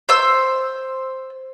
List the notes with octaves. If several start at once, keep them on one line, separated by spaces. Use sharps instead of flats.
C5 E6